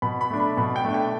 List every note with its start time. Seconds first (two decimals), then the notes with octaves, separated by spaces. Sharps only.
0.02 B2 B5
0.21 B5
0.31 A3 D4
0.40 B5
0.57 B2 B5
0.76 G5
0.85 A3 D4
0.94 G5